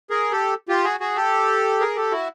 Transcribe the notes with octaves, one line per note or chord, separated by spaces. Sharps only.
G#4 A#4
G4 A4
F4 G4
F#4 G#4
F#4 G#4
G4 A4
G#4 A#4
G4 A4
E4 F#4